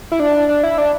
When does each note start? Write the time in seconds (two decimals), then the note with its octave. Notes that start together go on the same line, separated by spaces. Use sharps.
0.12 E4
0.20 D4
0.48 D4
0.63 E4
0.78 D4